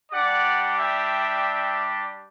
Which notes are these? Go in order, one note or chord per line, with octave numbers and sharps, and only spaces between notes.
G3 D4 G4 D5 F#5
E5 G5